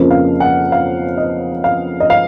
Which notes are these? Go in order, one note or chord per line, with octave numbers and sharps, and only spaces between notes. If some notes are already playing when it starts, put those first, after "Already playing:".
Already playing: F2 C#3 F3 A#3
F5
F#5
F5
D#5
F5
D#5
F5